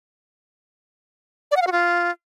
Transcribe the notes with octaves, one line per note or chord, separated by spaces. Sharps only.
D5
F#5
F5
F#4
F4